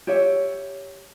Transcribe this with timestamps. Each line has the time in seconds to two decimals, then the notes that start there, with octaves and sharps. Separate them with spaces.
0.07 G4 C#5 E5